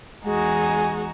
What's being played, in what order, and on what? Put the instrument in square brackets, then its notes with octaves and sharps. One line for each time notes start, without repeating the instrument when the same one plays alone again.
[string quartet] E2 D#4 F#4 [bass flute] G#3 [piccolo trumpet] G#5